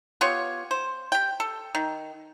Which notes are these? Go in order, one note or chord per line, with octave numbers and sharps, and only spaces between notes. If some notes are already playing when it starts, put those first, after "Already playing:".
B3 F4 G4 C#5
C5
G4 G5
A4
D#3